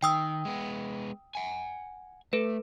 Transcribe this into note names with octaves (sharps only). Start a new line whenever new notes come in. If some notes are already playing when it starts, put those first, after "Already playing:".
D#3 G5 D#6 E6
G#3 B3
F#5 G#5
A3 A4 B4